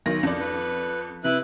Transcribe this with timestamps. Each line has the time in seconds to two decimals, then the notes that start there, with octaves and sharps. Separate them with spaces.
0.06 B1 D#3 A#6
0.23 F2 D5
0.40 B4
1.24 C3 E4 B4 F#6